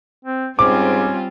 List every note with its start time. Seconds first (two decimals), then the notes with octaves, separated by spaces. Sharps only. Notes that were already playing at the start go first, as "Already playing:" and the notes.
0.25 C4
0.59 G#2 G3 C4 C#4 F4 D6